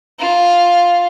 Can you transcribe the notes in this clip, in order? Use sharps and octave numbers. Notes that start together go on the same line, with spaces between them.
F4